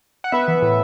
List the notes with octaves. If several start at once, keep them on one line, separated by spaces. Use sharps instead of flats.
F#5
B3 B4 E5
E3
A2